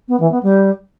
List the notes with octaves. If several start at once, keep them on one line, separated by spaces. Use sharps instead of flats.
B3
E3
B3
G3